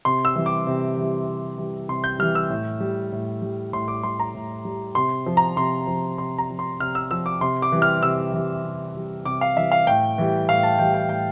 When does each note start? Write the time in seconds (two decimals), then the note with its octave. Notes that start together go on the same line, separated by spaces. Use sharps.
0.05 C3 C6
0.25 E6
0.36 E3 G3
0.46 D6
0.67 C3
0.96 E3 G3
1.27 C3
1.58 E3 G3
1.89 C3 C6
2.04 G6
2.19 E3 G3 F6
2.35 E6
2.50 A2
2.80 G3
3.12 A2
3.42 G3
3.73 A2 C6
3.88 D6
4.03 G3 C6
4.20 A#5
4.35 A2
4.65 G3
4.95 C3 C6
5.26 F3
5.37 A#5
5.57 C3 C6
5.87 F3
6.18 C3 C6
6.38 A#5
6.50 F3
6.59 C6
6.80 C3 F6
6.95 E6
7.11 F3 E6
7.26 D6
7.41 C3 C6
7.62 D6
7.72 E3 G3
7.82 F6
8.03 C3 E6
8.33 E3 G3
8.64 C3
8.95 E3 G3
9.25 C3 D6
9.41 F5
9.57 E3 G3 E5
9.72 F5
9.87 A2 G5
10.18 E3 G3
10.49 A2 F5
10.63 A5
10.78 E3 G3 G5
10.94 G5
11.09 A2 G5